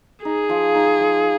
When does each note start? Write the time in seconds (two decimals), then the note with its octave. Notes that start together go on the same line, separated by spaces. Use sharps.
0.25 D#4 G#4
0.49 F3
0.75 D#4
1.00 F3